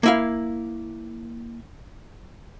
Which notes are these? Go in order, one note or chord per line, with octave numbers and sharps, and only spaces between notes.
A#3 E4 F5